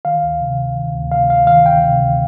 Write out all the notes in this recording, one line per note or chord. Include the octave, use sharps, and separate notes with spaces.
D#3 F5
D2
C3
D2
D#3
D2
C3 F5
D2 F5
D#3 F5
D2 G5
C3
D2